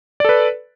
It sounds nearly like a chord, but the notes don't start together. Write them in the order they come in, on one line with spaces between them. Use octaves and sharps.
D5 A4 B4